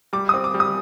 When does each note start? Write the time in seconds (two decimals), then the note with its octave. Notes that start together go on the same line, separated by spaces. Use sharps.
0.13 G3 D6
0.29 C4 D#6
0.44 D6
0.54 G3
0.60 D#6